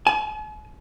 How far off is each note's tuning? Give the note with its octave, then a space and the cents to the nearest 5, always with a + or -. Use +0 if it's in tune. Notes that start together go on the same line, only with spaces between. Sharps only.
G#5 +45